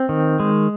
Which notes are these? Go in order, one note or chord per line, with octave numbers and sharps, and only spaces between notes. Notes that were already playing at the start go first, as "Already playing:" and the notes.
Already playing: C4
D#3
G#3